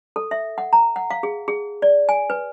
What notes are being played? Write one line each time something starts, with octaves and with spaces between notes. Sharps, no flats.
A4
E5
F#5
A#5
F#5
F5
G#4
G#4
D5
G#5
B4